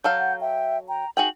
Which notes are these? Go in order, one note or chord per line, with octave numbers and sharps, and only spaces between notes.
F#3 A4 F5 G6
F#5
E5 G5
G5 A#5
D#4 F#4 G#4 G5 F#7